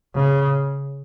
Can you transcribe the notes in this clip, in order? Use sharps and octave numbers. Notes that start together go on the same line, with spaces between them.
C#3